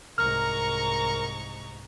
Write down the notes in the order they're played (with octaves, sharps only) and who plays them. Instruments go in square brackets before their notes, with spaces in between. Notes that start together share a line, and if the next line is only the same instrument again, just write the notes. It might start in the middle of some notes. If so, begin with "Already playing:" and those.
[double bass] C2 G#2 [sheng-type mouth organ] A#4 [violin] A#5 C#6 [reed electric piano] F6